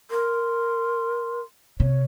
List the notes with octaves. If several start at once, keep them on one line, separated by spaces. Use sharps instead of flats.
A#4 C6
C3 C#5